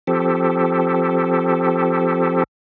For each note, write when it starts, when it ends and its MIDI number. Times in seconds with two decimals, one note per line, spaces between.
0.07 2.44 53
0.07 2.44 60
0.07 2.44 67
0.07 2.44 69